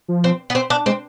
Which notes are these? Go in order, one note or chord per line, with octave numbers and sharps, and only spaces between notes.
F3
C4
B3
C4
D4
G#3 C4